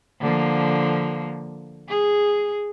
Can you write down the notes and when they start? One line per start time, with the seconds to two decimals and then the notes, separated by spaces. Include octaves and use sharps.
0.21 D3 F3 A#3
1.89 G#4